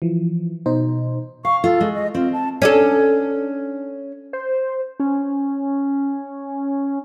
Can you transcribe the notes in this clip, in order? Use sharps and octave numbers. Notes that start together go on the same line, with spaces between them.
E3 F3
B2 D#4 C5
F5 C#6
F4 A4
G#3
D#5
C4 F4
A5
C#4 D4 A4
C5
C#4